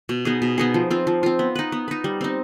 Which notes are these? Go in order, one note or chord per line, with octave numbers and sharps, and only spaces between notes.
B2
B3 D#4 G#4
B2
B3 D#4 G#4
F3
C4 F4
F3
C4 F4
B3
D#4 B4
B3
D#4 B4
G3
C4 D#4